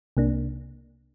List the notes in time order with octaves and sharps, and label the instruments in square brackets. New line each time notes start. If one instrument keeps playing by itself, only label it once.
[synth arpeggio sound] C2 C3 A#3 D4